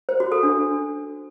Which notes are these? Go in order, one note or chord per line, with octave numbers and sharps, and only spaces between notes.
C5
F#4
A4
D4